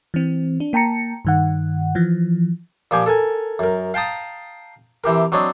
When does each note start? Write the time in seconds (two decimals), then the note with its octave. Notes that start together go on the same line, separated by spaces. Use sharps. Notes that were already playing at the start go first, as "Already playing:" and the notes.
0.14 E3 C4
0.60 D4
0.73 A#3 G5 A5 A#5 C#7
1.25 G2 D#3 F#5
1.95 E3 F3
2.91 A#2 F3 G4 G#5
3.06 A4 A#4 G#5
3.59 F#2 A#4
3.94 F5 G5 A5 A#5 D#6
5.04 C3 E3 G4 A#4
5.32 F#3 C4 D4 C#5 D#5